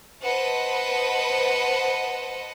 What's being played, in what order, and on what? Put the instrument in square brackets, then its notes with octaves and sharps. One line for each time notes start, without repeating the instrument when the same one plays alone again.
[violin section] B4 C5 D#5 F#5 A5